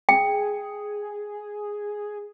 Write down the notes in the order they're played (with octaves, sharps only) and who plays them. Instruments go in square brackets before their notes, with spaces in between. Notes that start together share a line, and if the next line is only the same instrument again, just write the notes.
[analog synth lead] G#4 [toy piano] G5